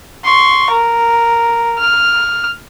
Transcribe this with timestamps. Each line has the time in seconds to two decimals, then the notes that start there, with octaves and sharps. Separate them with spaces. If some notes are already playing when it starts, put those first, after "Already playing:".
0.25 C6 C#6
0.71 A#4
1.79 F6